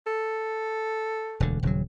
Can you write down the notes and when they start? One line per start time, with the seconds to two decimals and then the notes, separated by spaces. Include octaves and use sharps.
0.07 A4
1.40 E1 D2 D3
1.63 D#1 C#3 F#3